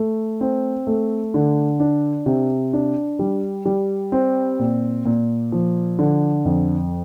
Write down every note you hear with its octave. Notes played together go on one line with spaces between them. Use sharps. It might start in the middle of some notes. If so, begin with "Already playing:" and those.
Already playing: A3
C4
A3
D3
D4
C3
D4
G3
G3
C4
A#2
A#2
F3
D3
F2